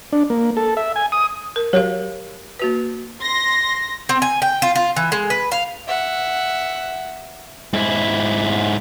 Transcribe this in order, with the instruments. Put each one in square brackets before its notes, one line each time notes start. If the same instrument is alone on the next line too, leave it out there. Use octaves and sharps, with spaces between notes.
[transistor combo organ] D4
A#3
A4
E5
G#5
D#6
[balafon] A#4
[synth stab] F#3 [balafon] G4 A#4 F5
[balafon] A#3 F#4 B4
[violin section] C6 A#6
[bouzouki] C4
G#5
G5
F4
F4
E3
G#3
B4
F5
[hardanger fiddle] E5 F#5
[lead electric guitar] G#2 E4